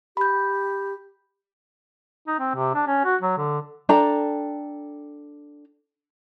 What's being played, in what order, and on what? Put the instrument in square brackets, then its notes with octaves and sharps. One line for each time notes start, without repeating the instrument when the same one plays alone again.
[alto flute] G4 [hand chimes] B5 G6
[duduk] D#4
C4
C3
D4
C#4
F#4
F#3
D3
[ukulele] D4 A4 G5 A#5